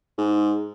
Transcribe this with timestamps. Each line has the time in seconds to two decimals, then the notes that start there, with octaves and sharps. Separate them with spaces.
0.18 G#2